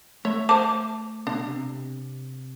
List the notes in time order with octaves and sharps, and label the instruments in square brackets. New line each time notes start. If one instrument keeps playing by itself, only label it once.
[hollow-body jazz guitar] A3 E5 [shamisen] C#5
[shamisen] C5 A5 [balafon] D6
[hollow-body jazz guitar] B2 [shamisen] D4
[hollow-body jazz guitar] C3